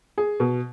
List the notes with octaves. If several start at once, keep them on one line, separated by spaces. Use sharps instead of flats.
G#4
B2